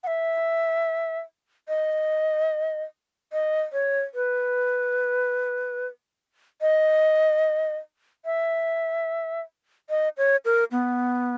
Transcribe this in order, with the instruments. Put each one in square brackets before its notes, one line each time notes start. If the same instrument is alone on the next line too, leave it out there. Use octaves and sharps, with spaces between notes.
[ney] F#5
E5
D#5
D#5
C#5
B4
D#5
E5
D#5
C#5
A#4
B3